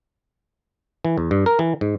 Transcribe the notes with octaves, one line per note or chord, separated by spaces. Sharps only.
E3
E2
G2
A#4
E3
G#2